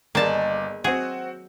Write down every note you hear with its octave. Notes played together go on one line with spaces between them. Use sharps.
G1 D#3 G#3 A#3 D5 A5
F#3 C4 F#4 G#4